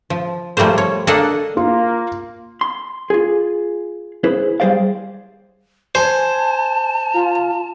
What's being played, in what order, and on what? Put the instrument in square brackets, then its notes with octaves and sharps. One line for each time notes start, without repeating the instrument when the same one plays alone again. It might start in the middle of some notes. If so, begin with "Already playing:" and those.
[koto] F3
F3 G3 A3 A#3 C5
C#5
A#3 D4 A4 D5 D#5 F#5
[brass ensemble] A#3 [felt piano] F4
[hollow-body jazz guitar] C6
F4 G#4
E4 G#4 B4 C5
G3 G#4 C5 D5 F5
[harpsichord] C5 [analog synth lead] G#5 [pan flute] A5
[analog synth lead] F4